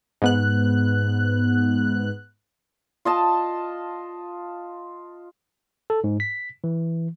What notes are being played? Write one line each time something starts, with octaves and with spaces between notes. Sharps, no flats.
G#2 B3 F#6
F4 D#5 A5
A4
G#2
B6
E3